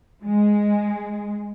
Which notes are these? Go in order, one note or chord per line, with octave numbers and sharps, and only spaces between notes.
G#3